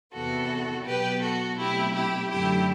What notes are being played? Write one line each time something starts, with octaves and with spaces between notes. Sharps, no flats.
E2 C3 E3 B3 F#4 A4
B2 F#3 B3 G4 B4
F#4 A4
B2 F#3 A3 C4 E4 G4
E4 G4
F#2 D3 F#3 A3 E4 G4